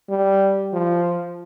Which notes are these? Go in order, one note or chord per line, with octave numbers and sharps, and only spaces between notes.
G3
F3